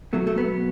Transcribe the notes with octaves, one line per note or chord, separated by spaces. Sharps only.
B2 F#3 A3
A3
B3